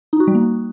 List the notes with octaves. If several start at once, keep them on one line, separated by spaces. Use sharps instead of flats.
D#4
F#4
G3
A#3